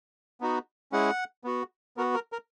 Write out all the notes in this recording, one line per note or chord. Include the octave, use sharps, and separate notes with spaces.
B3 D#4 F#4
G#3 C#4 E4 G#4 F#5
B3 F#4
B3 F#4 A#4
A#4
A#4